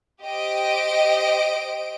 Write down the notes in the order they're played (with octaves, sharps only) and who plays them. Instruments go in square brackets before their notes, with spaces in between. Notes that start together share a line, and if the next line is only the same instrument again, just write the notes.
[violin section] G4 C5 D#5 D7